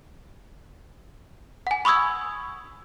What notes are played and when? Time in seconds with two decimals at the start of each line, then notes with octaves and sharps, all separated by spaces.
1.67 F#5 G#5
1.85 B5 C#6 D#6 E6 G#6